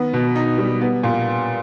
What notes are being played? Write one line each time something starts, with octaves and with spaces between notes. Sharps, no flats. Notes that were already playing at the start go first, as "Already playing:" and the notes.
Already playing: D#3 B3
B2
D#4
G3
B3
A#2